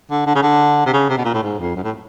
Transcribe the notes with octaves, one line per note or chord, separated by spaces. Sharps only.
D3
D3
C#3
D3
C3
C#3
C3
B2
A#2
A2
G#2
F2
F#2
A2